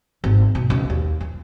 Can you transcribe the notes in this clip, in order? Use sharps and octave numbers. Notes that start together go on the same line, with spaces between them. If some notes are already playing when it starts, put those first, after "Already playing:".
G#1
B2
C#2
D#2
F4